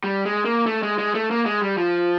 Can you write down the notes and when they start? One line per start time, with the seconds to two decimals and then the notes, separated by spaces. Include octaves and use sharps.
0.04 G3
0.25 G#3
0.45 A#3
0.66 A3
0.83 G#3
0.99 G#3
1.15 A3
1.31 A#3
1.46 G#3
1.62 G3
1.78 F3